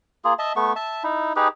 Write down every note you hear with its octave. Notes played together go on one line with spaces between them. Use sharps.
A#3 F4 G#4
D#5 E5 A5
A3 B3 C#6
E5 A5
D#4 E4
D#4 G4 G#4 B4